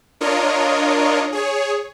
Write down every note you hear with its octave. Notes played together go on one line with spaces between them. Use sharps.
D4 F4 A#4 C#5 D#5
G#4 C#5